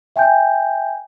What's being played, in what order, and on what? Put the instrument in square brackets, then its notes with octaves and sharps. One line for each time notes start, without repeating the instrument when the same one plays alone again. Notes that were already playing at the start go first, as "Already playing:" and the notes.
[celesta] E5 G5 G#5 G6